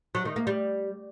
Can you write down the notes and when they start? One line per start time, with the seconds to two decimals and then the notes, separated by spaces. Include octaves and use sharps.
0.15 F#3
0.25 D#3
0.36 A#3
0.47 G3